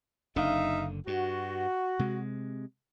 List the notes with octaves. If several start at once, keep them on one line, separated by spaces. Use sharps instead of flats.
F#1 D3 D4 D#4 E5 F5
G2 F#4
C3 G#3